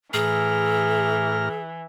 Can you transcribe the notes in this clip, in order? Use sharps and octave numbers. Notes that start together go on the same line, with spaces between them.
A2 E3 G#4 A#5 F6